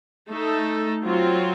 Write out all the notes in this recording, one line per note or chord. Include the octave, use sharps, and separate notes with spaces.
A3 D#4 A4
F#3 C4 F4